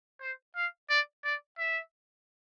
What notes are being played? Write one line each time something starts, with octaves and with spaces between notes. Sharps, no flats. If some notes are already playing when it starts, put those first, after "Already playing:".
C5
F5
D5
D5
E5